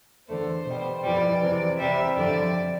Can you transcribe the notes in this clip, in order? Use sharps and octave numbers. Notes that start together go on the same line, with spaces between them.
E2 D3 A3 C5
B2 G3
F2 E3 G3 D5
E2 C3 E3
E2 C3 G3 E5
F2 D3 G3 D5